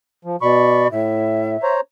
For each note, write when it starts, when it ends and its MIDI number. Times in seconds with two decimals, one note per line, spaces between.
0.25 0.36 53
0.42 0.88 47
0.42 0.90 74
0.42 0.88 83
0.42 0.88 85
0.91 1.57 45
0.91 1.72 76
1.63 1.81 72
1.63 1.81 73
1.63 1.81 82